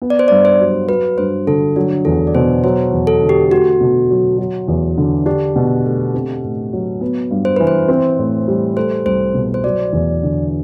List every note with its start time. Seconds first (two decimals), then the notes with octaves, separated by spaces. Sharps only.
0.02 B3
0.10 D5
0.19 C5
0.28 G2 D5
0.45 C5
0.60 F#3
0.89 F#3 B4
1.18 G2 C5
1.47 D3 A4
1.76 F#3 D4
2.05 E2 A4
2.27 D5
2.35 B2 C5
2.64 F#3 C5
2.93 E2
3.07 A4
3.22 D3
3.29 G4
3.51 A3 F#4
3.81 B2
4.10 F#3
4.38 F#3
4.68 E2
4.98 D3
5.26 D4 G4
5.56 B2
5.85 A3
6.14 C4
6.44 A2
6.73 F#3
7.01 B3
7.31 G2
7.45 C5
7.56 E3 B4
7.67 C5
7.88 C4
8.19 A2
8.48 G3
8.77 A3 C5
9.06 C2 C5
9.34 B2
9.54 C5
9.64 F#3 D5
9.93 E2
10.23 D3